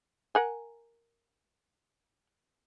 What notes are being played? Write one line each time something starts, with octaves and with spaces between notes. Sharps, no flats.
A#4 F#5 G#5